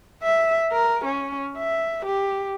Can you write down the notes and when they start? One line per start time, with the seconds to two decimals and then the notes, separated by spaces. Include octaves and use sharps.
0.23 E5
0.72 A#4
1.05 C#4
1.58 E5
2.06 G4